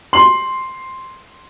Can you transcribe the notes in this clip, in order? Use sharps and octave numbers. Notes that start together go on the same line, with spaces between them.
C6 F#7